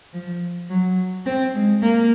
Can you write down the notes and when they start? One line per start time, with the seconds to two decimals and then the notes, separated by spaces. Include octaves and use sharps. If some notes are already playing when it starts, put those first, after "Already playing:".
0.13 F3
0.69 F#3
1.26 C4
1.54 G#3
1.82 A#3